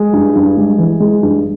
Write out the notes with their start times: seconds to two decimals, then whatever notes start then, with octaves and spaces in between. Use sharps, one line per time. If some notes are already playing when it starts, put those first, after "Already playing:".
Already playing: G#3 G#4
0.13 G2
0.35 G2
0.57 G#3
0.78 E3
1.00 G#3
1.22 G2